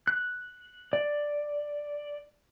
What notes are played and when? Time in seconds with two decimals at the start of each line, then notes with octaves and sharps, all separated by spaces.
0.07 F#6
0.93 D5